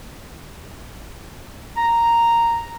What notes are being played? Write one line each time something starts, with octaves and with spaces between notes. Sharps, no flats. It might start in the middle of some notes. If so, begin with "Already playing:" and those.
A#5